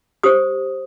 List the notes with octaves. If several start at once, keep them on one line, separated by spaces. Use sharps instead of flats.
G4 C5 D#6